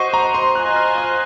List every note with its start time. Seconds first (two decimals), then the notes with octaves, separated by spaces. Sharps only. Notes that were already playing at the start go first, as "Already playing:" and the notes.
Already playing: F#4 C5 D#5 C#6
0.14 A#5
0.35 C6
0.55 F4 C5 D#5 G#5 F#6
0.76 F6
0.98 F#6